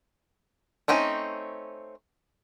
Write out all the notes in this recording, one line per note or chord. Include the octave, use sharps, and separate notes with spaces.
A3 C4 C#4 D#4